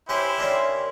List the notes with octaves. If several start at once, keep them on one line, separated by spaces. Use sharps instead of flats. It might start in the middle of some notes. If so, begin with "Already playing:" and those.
C#4 E4 G4 B4 C5
D#3 C#4 D4